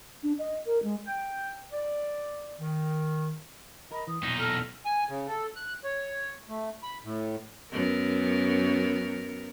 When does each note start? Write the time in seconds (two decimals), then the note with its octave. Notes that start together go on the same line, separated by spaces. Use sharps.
0.23 D4
0.39 D#5
0.66 A#4
0.83 G#3
1.06 G5
1.73 D5
2.60 D#3
3.91 A#4 D#5 B5
4.07 E3 D#6
4.23 B1 E2 A#2 D#4
4.39 A4 F6
4.85 G#5
5.09 C#3
5.27 A4
5.56 F#6
5.84 C#5
6.49 A3
6.83 B5
7.04 A2
7.71 F#2 B3 A#4